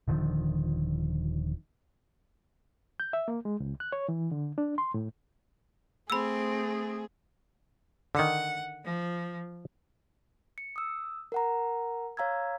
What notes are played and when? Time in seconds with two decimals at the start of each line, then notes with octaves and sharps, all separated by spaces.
0.08 D#1 D3 D#3 F3
3.00 G6
3.13 E5
3.28 A#3
3.45 G#3
3.60 C#2
3.80 F#6
3.92 C#5
4.09 E3
4.31 D3
4.58 D4
4.78 C6
4.94 A2
6.10 A3 C4 G#4 B5 E6
8.15 D3 D#3 F#5
8.84 F3
10.58 C#7
10.76 D#6 E6
11.32 A#4 F#5 A#5
12.17 C#5 F5 A#5 E6 G#6